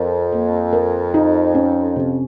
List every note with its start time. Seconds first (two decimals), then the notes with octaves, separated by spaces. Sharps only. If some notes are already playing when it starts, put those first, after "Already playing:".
Already playing: F2 A#4
0.32 A#3
0.73 A#4
1.14 D#4
1.55 C#4
1.96 C3